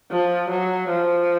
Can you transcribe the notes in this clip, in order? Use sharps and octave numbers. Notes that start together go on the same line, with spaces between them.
F3
F#3
F3